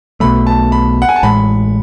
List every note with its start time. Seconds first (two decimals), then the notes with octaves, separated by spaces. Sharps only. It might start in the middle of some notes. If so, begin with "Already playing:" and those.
0.20 B1 B2 F#3 A3 B5
0.47 A5
0.72 B5
1.02 F#5
1.09 G#5
1.16 A5
1.23 A1 A2 G#3 B5